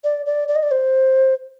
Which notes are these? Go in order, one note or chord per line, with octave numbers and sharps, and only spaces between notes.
D5
D5
D5
D#5
D5
C5